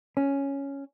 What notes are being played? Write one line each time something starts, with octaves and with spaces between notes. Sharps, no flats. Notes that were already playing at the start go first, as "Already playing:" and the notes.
C#4